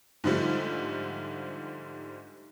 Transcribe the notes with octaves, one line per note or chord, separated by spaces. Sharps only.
G#2 D3 F3 G3 A3